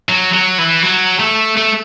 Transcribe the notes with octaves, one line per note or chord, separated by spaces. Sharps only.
F#3
F#3
E3
F#3
A3
A3